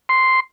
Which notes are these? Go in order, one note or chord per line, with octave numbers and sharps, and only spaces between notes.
C6